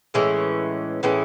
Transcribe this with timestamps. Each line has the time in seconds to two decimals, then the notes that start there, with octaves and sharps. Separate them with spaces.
0.14 A2 E3 G#3 C#4
1.03 A2 E3 G#3 C#4